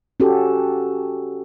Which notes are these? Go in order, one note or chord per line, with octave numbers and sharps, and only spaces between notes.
C#4 F#4 G4 A4